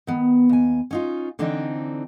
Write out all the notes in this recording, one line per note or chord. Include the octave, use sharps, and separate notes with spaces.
D#3 B3
D#2 G#5
C#4 D#4 F4
D3 E3 C4 D4 D#4